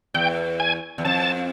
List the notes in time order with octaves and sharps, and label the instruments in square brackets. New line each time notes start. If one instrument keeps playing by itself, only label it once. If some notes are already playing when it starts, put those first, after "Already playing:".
[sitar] E2 [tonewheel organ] G5
[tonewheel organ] G#5
[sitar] E2
[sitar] F2 [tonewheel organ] A5